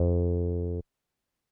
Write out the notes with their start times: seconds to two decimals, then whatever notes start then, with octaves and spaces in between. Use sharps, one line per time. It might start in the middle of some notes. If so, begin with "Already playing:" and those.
Already playing: F2